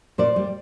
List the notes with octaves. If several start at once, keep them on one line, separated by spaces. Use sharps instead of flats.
A#2 C5 D5
G3